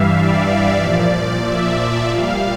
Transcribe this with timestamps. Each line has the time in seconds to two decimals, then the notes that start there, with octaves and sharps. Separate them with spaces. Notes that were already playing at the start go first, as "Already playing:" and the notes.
Already playing: G2 E3 G3 E5 F5
0.15 D5
0.79 A#2 F3
1.44 E5
2.08 A#2 G3 F5